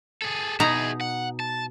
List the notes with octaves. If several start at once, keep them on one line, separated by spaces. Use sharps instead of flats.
G#4 A4
B2 D#4 E4 G#4 A#5
F#5
A5